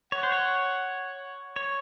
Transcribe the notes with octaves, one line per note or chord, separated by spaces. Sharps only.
C#5 F#5
C5
C#5
C#5